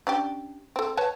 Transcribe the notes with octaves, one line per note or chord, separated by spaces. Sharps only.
C#4 D4 G4
C4 A4
B4 C#5 A5